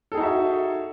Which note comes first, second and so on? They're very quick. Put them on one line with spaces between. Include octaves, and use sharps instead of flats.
A4 G#4 D#4 F#4 E5